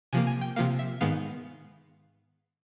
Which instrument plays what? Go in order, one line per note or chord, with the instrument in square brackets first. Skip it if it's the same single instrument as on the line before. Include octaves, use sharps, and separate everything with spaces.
[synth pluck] C3 F3 A#3 G#5
G#5
G5
C3 F3 A#3 F5
E5
G#2 D#3 G#3 B3 F5